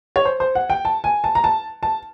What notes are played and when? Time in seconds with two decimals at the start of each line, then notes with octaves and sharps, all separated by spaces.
0.16 C#5
0.25 C5
0.40 C5
0.55 F#5
0.70 G5
0.85 A5
1.04 G#5
1.24 A5
1.35 A#5
1.44 A5
1.83 A5